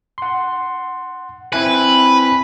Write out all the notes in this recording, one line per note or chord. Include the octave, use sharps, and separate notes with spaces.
F#5 C6
C4 E4 B4 G#5